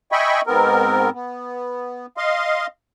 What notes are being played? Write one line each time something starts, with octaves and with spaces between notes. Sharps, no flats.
D#5 E5 G5 G#5 B5 C#6
G#2 B3 C4 A#4
B3
D#5 F5 C6